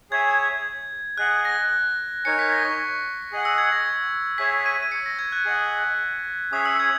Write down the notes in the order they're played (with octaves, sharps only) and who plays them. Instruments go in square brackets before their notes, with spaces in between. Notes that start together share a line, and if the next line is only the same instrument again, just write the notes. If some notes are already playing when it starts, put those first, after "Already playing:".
[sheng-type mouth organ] G#4 C#5 E5 G#5 [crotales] G#6
[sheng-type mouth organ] G#4 D#5 F#5 [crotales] F#6
[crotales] A#6
[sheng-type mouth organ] D#4 A#4 C#5 G#5 [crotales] C#7
[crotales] B6
A#6
C#6
[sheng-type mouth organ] G#4 D#5 F#5
[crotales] E6
G#6
A#6
[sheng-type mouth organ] G#4 C#5 E5 G#5 [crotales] B6
[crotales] D#7
D#7
C#7
A#6
G#6
F#6
[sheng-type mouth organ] G#4 D#5 F#5
[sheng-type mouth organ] C#4 G#4 C#5 E5 G#5 [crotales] D#6
[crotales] E6
G#6